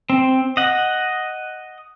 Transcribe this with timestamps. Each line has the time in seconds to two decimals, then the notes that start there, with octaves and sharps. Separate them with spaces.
0.10 C4
0.57 D#5 F#5